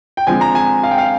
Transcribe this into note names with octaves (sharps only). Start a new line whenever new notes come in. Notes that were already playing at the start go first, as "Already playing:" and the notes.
G5
D3 F3 G#3 C4 G#5
A#5
G#5
F5
G5
F5